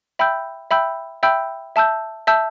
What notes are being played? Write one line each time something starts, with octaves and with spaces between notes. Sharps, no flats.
E5 G5 B5 E6 G6
E5 G5 B5 E6 G6
E5 G5 B5 E6 G6
E5 A5 E6 G6
E5 A5 E6 G6